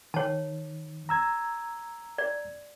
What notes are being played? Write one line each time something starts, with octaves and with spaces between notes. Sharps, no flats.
D#3 C#5 A5
A#5 E6 G#6
D5